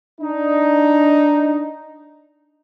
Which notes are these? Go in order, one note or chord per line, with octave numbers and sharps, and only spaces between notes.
D4 D#4